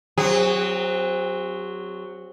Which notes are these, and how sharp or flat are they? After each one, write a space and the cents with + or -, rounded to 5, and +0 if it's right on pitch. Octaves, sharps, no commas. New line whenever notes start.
F#3 +0 C4 +0 G#4 -40